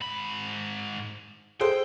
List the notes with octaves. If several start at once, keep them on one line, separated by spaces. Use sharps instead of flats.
G#2 B5
G#4 A4 C5 G5